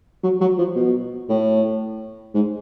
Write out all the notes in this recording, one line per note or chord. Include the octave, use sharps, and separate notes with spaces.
F#3
F#3
F3
B2
A2
G#2